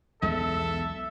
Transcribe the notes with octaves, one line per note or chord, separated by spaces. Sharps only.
B1 E2 G#3 A4 E5